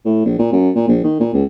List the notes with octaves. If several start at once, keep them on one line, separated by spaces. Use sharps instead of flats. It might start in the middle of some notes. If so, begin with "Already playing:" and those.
A2
A#1
A#2
F#2
A#2
A#1
D#3
A#2
C#2